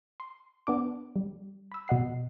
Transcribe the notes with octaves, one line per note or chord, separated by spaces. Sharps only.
C6
B3 D4 D6
G3
B5 E6
B2 D#5 F#5 C7